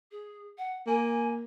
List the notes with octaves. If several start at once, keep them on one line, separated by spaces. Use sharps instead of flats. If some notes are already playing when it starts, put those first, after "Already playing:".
G#4
F#5
A#3 G#5